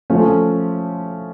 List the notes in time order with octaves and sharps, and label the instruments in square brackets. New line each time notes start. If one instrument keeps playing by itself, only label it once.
[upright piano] F3 A3 C#4